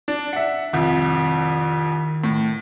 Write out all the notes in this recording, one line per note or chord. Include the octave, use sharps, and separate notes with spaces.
D4
E5 F#5
C2 F2 D#3
A2